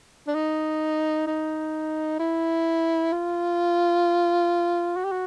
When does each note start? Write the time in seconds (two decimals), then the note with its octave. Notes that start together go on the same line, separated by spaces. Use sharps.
0.27 D4
0.35 D#4
1.27 D#4
2.19 E4
3.12 F4
4.96 F#4
5.04 G4
5.11 F#4